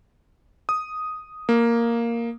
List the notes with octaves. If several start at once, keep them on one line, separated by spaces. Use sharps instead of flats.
D#6
A#3